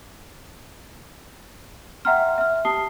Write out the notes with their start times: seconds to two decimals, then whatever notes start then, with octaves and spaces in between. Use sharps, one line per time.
2.05 E5 F#5 G5 A#5 C6 F6
2.38 E5 F6
2.65 G4 A5 D#6 C7 G7